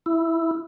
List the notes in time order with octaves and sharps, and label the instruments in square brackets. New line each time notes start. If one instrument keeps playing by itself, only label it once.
[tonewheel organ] E4